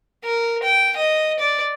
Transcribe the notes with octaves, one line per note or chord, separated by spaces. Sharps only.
A#4
G5
D#5
D5